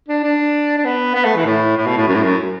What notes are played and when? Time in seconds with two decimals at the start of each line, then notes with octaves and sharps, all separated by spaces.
0.08 D4
0.23 D4
0.78 D4
0.85 B3
1.15 B3
1.25 A3
1.36 E3
1.45 A2
1.77 A2
1.87 B2
1.97 A2
2.07 F#2
2.15 A2
2.23 F#2